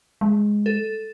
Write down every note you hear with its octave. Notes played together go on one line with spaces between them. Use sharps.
G#3
A4